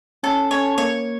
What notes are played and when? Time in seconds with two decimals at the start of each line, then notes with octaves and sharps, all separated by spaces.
0.23 C#4 A4
0.51 C#4 C#5
0.78 A#3 C#5